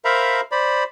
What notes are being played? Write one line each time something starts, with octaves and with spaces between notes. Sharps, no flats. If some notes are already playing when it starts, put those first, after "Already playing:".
A#4 C5 E5 F5 A#5 B5
C5 D5 B5